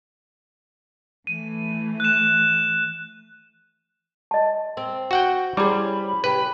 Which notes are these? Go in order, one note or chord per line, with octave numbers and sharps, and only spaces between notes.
E3 A3 D#7
F#6 E7
D#5 A5
C4
F#4 F#5 G5
G3 C#4 E4 G#4 C5 B5 D6
C#3 G4 B4